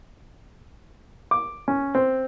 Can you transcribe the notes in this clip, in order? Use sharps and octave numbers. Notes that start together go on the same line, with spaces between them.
D6
C#4
C4